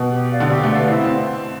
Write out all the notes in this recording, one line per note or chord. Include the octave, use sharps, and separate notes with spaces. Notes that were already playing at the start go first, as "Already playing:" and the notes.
Already playing: B2
G4
D5 F5
D3
C3 G4
A3
D5 F5
B3
C4 E4
C4